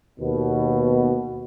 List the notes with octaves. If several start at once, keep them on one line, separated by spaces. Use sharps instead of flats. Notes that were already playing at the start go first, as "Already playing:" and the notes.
D#2 B2